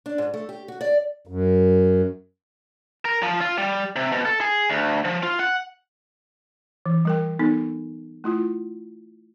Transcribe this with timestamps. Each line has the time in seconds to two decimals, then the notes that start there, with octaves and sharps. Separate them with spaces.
0.06 D4
0.18 G#2
0.34 A3
0.49 G4
0.68 F#4
0.81 D5
1.27 F#2
3.05 A#4
3.23 F3
3.41 F4
3.58 G3
3.96 C3
4.12 B2
4.25 A4
4.41 G#4
4.70 D2
5.05 F3
5.23 F4
5.39 F#5
6.86 E3
7.05 G3 A#4 G5
7.39 B3 D#4 A4
8.24 A3 E4 F4